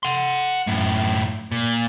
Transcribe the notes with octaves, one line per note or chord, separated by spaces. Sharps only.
F#5 C6
F#2 A2
A#2